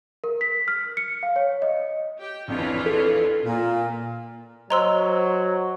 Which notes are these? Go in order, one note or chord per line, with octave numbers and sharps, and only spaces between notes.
A#4
B6
F6
C#7
F5
C#5
D#5
G4 G5
A#1 F2 E3 F4 C#5
A4
A#2
F#3 C5 D#5 A#5 C6 E6